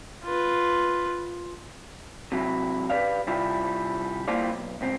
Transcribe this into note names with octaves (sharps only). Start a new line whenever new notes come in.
F4 B4
C3 F#3 E4
G4 B4 C#5 D5 F5
C3 G3 E4 F4
G3 A#3 E4 F4 C5 D5
B1
C#2 C4